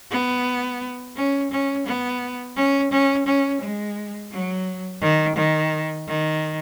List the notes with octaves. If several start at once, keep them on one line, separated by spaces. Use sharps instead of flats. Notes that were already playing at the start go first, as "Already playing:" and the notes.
B3
C#4
C#4
B3
C#4
C#4
C#4
G#3
F#3
D#3
D#3
D#3